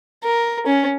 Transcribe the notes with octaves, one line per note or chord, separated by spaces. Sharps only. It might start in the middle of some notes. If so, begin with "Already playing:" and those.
A#4
C#4